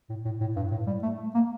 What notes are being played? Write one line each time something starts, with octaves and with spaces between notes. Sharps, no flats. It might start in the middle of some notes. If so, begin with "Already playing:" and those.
A2
A2
A2
G2
A2
G3
A3
A#3